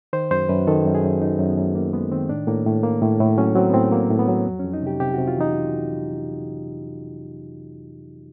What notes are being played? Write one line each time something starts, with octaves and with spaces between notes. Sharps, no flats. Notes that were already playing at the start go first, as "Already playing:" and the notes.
D#3 C5
F#2 C5
F#2 B4
D#3 A4
F#2
G#4
F#2
F#2 D#4
F#2
B3
F#2
F#2 A#3
G#3 B3
D#3 C4
A2 D4
A2 A#3
A2
A#3
A2
A2
F#3 C#4
F#3 C4
B3
A2 C4
F#3 A#3
A2
B3
F#3
F2
F2 C#4
D#4
C3 G4
C3 G4
C3 F#4
F4
E3 D#4